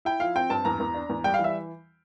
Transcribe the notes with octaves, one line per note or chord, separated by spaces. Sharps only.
E4 G5
F3 F5
C4 G5
G2 A5
E2 A#5
E2
D4
E2
G3 G5
F5
E3
E5